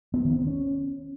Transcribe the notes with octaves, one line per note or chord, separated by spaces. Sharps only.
B3
D#3
C4
C#4